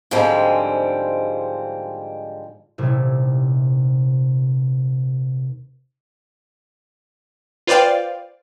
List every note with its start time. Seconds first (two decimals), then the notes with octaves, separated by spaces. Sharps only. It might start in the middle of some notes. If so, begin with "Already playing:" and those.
0.11 G#2 D3 F3 G3 G#3 C4
2.78 D#1 C3 E4
7.67 F4 B4 C5 D5 F5 G5